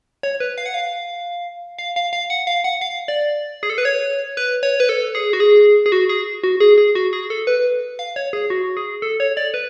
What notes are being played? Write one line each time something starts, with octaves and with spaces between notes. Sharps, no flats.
C#5
B4
F5
F#5
F5
F5
F5
F5
F#5
F5
F#5
F5
D5
G#4
A4
B4
C#5
B4
C#5
B4
A4
G#4
F#4
G#4
G#4
F#4
G#4
F#4
G#4
G#4
F#4
G#4
A4
B4
F5
C#5
G#4
F#4
G#4
A4
C#5
D5
B4